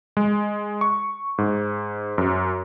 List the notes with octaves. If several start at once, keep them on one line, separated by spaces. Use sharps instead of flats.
G#3
C#6
G#2
F#2